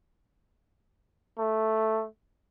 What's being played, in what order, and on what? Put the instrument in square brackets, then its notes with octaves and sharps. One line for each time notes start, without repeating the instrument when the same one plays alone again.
[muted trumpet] A3